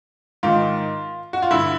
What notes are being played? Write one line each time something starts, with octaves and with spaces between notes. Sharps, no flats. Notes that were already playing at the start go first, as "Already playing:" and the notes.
G#2 D#3 F4
F#4
F4
G2 D3 E4